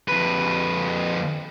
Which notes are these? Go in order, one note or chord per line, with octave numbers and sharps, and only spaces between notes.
F2 B4